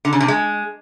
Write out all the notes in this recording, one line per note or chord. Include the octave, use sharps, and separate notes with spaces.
D3
C#3
C3
G#3